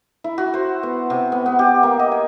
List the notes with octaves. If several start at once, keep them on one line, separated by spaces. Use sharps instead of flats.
E4
F#4
C5
B3
C3
B3
B3
G4
A#3
D#5
G#5